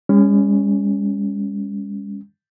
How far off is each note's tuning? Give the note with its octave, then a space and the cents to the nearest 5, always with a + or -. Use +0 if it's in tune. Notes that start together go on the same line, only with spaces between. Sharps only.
G#3 -45 C#4 +5